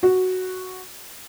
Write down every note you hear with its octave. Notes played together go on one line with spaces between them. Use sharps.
F#4